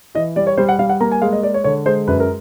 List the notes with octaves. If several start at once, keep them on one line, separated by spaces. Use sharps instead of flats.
E3 D#5
G3 D5
C#5
G3 C5
F#5
G3 F5
F#5
A#3 A#5
G#5
G#3 F5
D#5
G#3 D5
C#5
D3 C#5
G#3 C5
F#2 B4
A#4